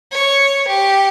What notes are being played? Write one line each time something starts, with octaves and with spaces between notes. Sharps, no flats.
C#5
G4